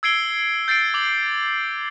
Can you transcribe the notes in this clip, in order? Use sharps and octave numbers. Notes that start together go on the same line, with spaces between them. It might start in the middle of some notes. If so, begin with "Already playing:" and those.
E6 G#6 C7 D7 G7
G6 A6 C7 D7
D6 F#7